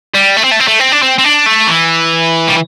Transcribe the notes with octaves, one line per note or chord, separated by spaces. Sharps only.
G3
A3
C4
A3
C4
A3
C4
D4
C4
C4
D4
A3
E3
G3